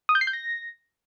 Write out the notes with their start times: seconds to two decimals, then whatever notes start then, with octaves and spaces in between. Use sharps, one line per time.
0.09 D#6
0.15 G6
0.21 C7
0.27 G6
0.33 A#6